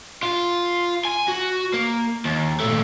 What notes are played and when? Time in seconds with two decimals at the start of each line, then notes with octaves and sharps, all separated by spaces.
0.23 F4
1.05 G#5
1.28 F#4
1.74 A#3
2.25 D#2
2.60 A#2 A3